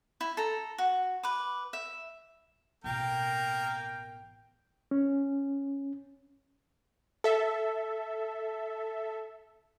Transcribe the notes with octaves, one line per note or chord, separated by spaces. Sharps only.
E4
A4 A#5
F#4
B4 D6
E5
A1 B2 A#3 A#4 G5
C#4
A4 E5